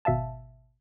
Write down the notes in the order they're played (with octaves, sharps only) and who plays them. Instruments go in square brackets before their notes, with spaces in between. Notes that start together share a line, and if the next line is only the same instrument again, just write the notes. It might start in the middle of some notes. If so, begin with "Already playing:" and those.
[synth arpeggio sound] G#1 B2 E5 F5 A5